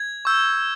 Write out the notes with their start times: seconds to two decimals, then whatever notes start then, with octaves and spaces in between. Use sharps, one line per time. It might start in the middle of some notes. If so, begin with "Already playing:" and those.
Already playing: G#6
0.25 C#6 E6 G6